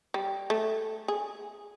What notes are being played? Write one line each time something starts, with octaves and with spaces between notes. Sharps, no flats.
G3
A3
G#4